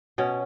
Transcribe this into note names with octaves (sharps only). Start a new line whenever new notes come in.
B2 C#4